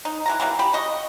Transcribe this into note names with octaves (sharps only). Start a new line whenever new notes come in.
D#4
E3 F#3 A#5
E3 F#3 G3 A#3
G4 B5
C#3 D#5 C#6